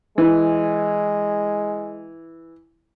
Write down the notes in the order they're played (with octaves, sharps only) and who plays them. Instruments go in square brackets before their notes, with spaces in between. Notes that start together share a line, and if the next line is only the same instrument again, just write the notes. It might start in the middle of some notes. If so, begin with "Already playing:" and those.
[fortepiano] E3 [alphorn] G#3